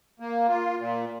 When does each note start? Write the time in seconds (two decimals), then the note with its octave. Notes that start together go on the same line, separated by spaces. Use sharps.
0.20 A#3
0.49 F4
0.79 A#2